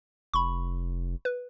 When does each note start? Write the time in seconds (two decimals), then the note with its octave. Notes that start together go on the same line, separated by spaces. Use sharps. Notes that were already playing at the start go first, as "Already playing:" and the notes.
0.34 F1 B5 C#6
1.25 B4